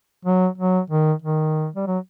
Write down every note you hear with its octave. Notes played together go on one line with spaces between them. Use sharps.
F#3
F#3
D#3
D#3
G3
F#3